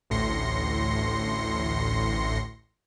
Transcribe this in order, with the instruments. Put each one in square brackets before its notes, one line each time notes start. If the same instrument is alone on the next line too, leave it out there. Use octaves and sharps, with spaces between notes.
[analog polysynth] A1 D2 A2 C6 A#6 C#7